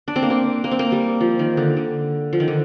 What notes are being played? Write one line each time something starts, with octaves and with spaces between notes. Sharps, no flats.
D4
C4
A#3
C4
A#3
C4
A#3
G3
F3
D#3
D3
D3
F3
D#3
D3